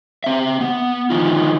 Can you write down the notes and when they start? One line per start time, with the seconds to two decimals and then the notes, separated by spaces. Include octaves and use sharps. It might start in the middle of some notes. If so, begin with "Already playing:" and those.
0.24 C4 E5
0.61 B3
1.10 D3 D#3 F3 D#4 F4